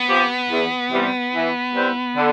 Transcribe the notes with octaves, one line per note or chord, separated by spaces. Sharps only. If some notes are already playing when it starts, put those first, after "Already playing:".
Already playing: B3
F3 C4 G4
E2
C3 E3 G3 C4
E3
G3 C4 E4 B4
D3